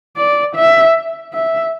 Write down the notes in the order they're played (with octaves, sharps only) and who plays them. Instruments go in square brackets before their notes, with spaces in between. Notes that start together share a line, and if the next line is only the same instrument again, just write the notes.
[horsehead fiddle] D5
E5
E5